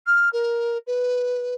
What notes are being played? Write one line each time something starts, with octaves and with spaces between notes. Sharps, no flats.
F6
A#4
B4